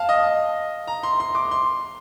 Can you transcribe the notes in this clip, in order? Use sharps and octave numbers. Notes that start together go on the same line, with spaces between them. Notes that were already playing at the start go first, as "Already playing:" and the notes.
Already playing: F5 A5
D#5
A#5
C6
C6
D6
C6